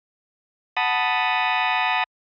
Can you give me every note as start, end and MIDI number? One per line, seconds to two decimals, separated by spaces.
0.77 2.04 78
0.77 2.04 81
0.77 2.04 83
0.77 2.04 87